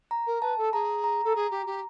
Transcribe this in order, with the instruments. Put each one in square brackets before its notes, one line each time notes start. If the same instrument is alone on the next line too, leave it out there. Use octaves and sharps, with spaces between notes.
[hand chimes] A#5
[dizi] A#4
[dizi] B4 [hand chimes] A5
[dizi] A4
[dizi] G#4 [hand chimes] A#5
[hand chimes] A#5
[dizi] A4
G#4
G4
G4